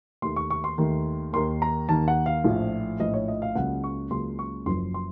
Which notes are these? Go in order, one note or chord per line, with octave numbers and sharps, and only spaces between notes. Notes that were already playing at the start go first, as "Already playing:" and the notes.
D#2 D#3 A3 C6
C#6
C#6
C6
D#2 D#3 A3
D#2 D#3 A#3 C6
A#5
D#2 D#3 A#3 A5
F#5
F5
A#1 A2 F3
A#1 A2 F3 D#5
C#5
D#5
F5
C#2 C#3 F#3 A#3 F#5
C#6
C#2 C#3 F#3 A#3 C6
C#6
F#1 F#2 F3 C6
C6